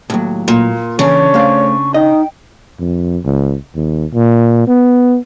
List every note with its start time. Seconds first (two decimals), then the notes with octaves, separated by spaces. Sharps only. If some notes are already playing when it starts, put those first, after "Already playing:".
0.10 D#2 A2 F#3
0.48 A#2
0.99 C#3 E3 D4 C#5 C#6
1.34 A3 C5 F5
1.94 D#4 D#5 G5
2.79 F2
3.25 C#2
3.75 D#2
4.14 A#2
4.68 B3